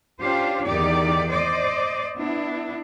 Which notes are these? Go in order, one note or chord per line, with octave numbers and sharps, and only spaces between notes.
C#4 D4 F4 G4 C5
E2 D#3 D#4 G4 D5
C5 D5 D#5
B3 D4 E4